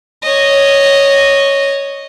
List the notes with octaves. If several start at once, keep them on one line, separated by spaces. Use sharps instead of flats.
C#5 D#5